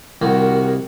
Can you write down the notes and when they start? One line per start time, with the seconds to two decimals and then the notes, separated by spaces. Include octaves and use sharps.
0.22 C2 D#3 F#4 A#4